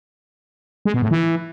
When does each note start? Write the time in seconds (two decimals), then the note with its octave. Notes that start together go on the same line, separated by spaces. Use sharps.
0.85 G#3
0.94 B2
1.02 A2
1.11 E3